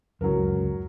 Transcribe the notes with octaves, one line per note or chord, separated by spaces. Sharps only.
D1 C#2 F#2 F#3 A#4